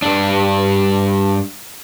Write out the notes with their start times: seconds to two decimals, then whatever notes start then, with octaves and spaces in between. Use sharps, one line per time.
0.02 G2 D4